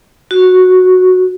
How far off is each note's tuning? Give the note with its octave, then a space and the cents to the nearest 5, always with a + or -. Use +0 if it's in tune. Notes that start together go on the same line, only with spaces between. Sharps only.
F#4 -5